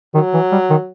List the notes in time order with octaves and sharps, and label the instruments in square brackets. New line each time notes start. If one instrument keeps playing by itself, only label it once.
[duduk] D#3 [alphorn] F#3
[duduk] E3
G3
D#3